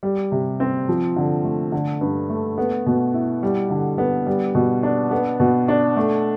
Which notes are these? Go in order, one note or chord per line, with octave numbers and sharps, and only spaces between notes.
G3
C3
C4
F3
D3
A3
D3
G2
A3
B3
B2
E4
G3
D3
B3
G3
B2
D4
B3
B2
D4
A3